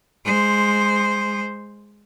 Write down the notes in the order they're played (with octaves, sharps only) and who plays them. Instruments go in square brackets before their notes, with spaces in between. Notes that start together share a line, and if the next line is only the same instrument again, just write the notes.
[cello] G#3 C5